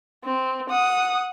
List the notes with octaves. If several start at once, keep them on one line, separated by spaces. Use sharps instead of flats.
C4
F#5 D#6